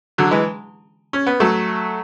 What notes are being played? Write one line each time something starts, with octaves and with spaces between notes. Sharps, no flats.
D3 F#3
E3 G#3
C#4
B3
F#3 A3